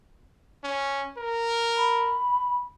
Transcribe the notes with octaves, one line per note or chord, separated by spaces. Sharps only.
C#4
A#4
B5